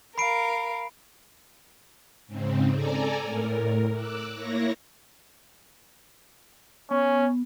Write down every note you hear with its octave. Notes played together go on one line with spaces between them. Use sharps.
A#4 F5 B5 C7 D7
G#2 C#3 C4
A4 D5 G#5 A#5
A2 A#4
D6 E6 F#6
A#3 E4 C#5 A#6
B3 C#4